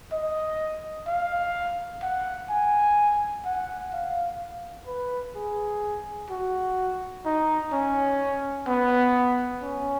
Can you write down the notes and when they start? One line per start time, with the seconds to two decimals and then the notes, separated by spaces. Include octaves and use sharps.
0.12 D#5
1.07 F5
2.03 F#5
2.50 G#5
3.45 F#5
3.93 F5
4.87 B4
5.36 G#4
6.31 F#4
7.26 D#4
7.73 C#4
8.68 B3
9.63 C#4